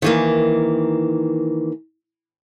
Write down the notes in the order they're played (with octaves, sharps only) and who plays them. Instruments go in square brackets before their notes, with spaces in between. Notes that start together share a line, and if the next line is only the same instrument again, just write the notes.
[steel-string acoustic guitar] D#3 E3 A#3